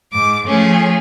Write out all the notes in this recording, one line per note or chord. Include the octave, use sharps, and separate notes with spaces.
G#2 D6
F3 A3 C#4 G#4